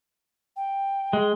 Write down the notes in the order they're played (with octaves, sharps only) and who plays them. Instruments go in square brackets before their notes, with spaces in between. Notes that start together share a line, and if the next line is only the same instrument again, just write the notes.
[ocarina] G5
[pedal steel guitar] G#3